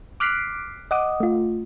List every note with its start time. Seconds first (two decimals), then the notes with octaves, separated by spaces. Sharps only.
0.20 D6 F6 F#6 B6 C7 D7
0.91 D#5 F#5 D6 D#6
1.20 A3 F4